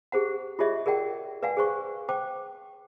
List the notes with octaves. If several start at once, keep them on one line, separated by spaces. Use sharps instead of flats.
G4 G#4 C5 F#5
F4 G4 G#4 C#5 D#5 E5
G#4 A#4 D5 F#5 G5
B4 D5 F5 F#5 G#5
G#4 C5 C#6
C5 G5 D6